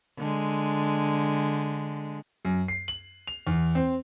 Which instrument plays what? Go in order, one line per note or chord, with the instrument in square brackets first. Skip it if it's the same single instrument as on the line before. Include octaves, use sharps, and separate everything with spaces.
[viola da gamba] D3 G#3
[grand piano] F#2
C7
F#7
F7
E2
C4